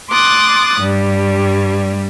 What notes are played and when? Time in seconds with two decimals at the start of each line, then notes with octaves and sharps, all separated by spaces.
0.10 C6 D6 D#6 F#6 A6
0.80 G2 G3